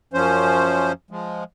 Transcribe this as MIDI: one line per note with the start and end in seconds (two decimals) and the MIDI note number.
0.13 0.92 42
0.13 0.92 53
0.13 0.92 61
0.13 0.92 72
1.11 1.44 53
1.11 1.44 56